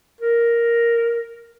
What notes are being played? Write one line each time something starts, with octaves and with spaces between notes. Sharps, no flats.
A#4